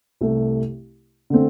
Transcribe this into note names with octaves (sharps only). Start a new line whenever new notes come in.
C2 C3 A3
D3 A3 C4